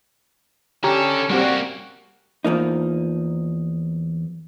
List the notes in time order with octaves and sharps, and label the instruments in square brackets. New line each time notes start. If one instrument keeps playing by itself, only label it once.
[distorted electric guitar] D3 A4 [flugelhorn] C#4 [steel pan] G4 [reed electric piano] A#5
[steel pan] G3 C4 [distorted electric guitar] A#3 C#4 [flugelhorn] F#4
[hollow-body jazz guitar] E2 F3 A#3 D#4